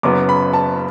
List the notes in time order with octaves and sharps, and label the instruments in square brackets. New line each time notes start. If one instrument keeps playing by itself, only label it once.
[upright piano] F#1 F#2 C#3 F#3 B3 D6
B5
A5